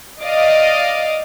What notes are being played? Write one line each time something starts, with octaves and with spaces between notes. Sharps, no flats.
D5 D#5 F5